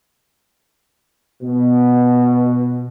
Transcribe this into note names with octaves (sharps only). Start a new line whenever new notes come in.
B2